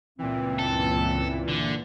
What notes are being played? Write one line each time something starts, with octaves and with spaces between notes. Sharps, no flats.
C#2 G2 A#2 E3 C4
A4
D3